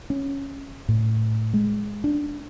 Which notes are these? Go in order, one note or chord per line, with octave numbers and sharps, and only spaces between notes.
C#4
A2
G#3
D4